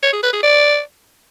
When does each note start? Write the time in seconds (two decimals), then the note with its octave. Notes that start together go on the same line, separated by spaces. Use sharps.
0.03 C#5
0.13 G#4
0.23 B4
0.33 G#4
0.43 D5